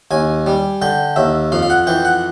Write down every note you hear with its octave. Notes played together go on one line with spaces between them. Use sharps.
D#2 G#5
G3
D3 G5
D#2 E5
F2 F5
F5
F#5
E3 G5
F#5